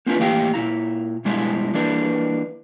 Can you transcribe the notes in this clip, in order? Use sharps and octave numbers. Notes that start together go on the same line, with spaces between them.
A#3 C4 D4 E4 F4 B4
A2 E3 A#3 G4 F5 G5
A#2 C#3 E4 A#5
G2 B2 G#3 D4 E4
E3 A#3 D4 B4